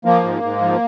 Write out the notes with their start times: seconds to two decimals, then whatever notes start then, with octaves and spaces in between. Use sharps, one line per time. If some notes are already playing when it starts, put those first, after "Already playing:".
0.05 F3 A#3
0.24 G#2
0.43 G#2
0.62 F3